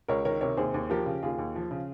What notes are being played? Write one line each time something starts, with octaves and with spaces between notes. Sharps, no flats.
C#2 A#4 C#5
D#3 A#4 C#5
C3 A#4 C#5
D#2 G#4 C5
D#2
F3 G4 A#4
C#3
D#2 F4 G#4
D#2
F3
C#3